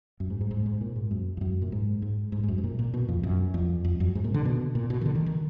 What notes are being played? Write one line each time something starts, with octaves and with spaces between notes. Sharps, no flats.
F#2
G#2
G#2
G#2
G#2
A#2
G#2
F#2
F2
F#2
A#2
G#2
G#2
G#2
G#2
F#2
G#2
A#2
A#2
B2
F2
F#2
F2
F2
F#2
G#2
A#2
D3
B2
A#2
B2
D#3
D3
D#3
D#3